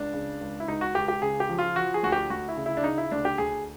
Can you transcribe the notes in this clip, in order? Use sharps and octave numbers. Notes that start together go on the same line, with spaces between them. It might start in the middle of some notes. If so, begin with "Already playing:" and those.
Already playing: C#2 D4
C#3
C#2
E4
C#2 D#4
F#4
C#2 G4
G4
C#3 G#4
G4
F3
F4
F3 F#4
G#4
D2 F#4
G4
D2 F#4
E4
C#3
E4
D4
C#3 D#4
E4
D2 D4
G4
D2 G#4